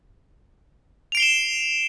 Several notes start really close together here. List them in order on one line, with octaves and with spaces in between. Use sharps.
F7 D7 C7 G7 E7